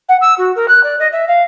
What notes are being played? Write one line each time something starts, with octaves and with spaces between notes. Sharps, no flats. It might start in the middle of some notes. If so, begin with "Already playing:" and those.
F#5
E6
F#4
A#4
F#6
D5
D#5
E5
F5